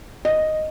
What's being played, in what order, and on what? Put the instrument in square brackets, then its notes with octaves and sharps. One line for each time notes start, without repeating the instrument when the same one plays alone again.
[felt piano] D#5